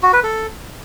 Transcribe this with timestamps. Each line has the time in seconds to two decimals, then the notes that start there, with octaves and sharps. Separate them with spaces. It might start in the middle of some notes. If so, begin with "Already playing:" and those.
0.03 F#4
0.13 B4
0.23 A4